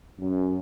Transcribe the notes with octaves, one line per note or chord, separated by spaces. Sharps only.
F#2